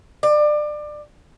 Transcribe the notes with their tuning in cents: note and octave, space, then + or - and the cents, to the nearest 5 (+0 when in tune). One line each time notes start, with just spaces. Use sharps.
D5 +25